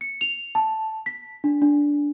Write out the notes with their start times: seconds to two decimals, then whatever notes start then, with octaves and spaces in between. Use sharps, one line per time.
0.01 C#7
0.21 F7
0.55 A5
1.06 B6
1.44 D4
1.62 D4